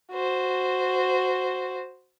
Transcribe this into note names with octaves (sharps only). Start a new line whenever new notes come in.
F#4 C5